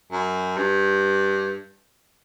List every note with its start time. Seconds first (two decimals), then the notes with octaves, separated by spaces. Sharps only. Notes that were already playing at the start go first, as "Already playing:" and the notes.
0.12 F#2
0.57 G2